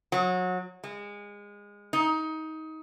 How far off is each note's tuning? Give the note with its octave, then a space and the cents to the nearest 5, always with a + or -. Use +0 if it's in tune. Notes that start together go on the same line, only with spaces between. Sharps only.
F#3 -25
G#3 -25
D#4 +20